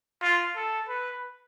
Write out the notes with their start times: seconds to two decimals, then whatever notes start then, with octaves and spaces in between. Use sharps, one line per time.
0.22 F4
0.56 A4
0.88 B4